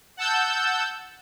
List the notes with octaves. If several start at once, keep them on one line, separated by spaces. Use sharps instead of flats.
F#5 A5 E6 G6